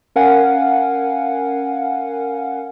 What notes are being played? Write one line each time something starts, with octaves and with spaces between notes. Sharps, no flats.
C#4 A#4 F5 F#5 G#5